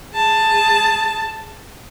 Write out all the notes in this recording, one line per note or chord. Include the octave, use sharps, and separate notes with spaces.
G#4 A5